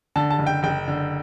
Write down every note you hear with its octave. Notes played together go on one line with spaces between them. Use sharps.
D3 A5
A5
F#1
G5
F#1 G5
D3